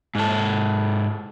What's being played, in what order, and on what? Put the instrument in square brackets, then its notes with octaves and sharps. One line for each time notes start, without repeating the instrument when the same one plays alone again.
[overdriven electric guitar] G#2 A4